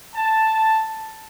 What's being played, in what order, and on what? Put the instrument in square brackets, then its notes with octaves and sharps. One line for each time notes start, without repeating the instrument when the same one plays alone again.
[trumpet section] A5